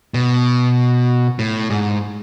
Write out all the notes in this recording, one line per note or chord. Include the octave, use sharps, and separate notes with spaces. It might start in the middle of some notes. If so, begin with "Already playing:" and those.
B2
A2
G#2